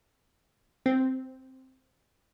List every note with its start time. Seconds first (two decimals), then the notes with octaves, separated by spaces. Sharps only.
0.86 C4